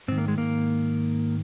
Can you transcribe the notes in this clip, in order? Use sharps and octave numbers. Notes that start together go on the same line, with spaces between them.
G#2 D#3 C4
A#3
G#3
A#3